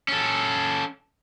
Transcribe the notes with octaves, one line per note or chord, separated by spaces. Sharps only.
C#4 A4